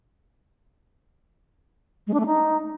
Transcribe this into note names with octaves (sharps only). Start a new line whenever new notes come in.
G#3
D4
A3
D#4